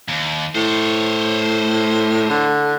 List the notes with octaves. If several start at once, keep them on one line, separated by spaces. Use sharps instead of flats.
D#2
A2 C5 C#5
D3